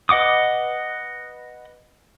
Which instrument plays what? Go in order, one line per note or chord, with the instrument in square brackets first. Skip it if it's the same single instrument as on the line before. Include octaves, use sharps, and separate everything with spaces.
[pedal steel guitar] B4 D#5 F#5 D6 D#6